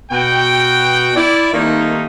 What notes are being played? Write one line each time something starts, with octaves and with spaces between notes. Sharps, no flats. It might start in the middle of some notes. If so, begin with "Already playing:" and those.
B2 F#4 G5
E4 D5
D#3 G3 A3 A#3 C4 D#4